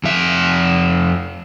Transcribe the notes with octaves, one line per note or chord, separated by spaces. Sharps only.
F2 E5